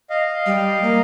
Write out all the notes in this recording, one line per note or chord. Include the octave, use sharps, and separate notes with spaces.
D#5 F5
G3
A#3